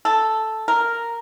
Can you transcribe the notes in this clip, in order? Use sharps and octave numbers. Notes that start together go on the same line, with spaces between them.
A4
A#4